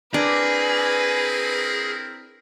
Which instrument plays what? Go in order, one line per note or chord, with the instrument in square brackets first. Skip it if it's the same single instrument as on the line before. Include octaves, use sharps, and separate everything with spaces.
[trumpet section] C4 E4 A#4 [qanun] D4 D5 [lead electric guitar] G#4 [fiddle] B4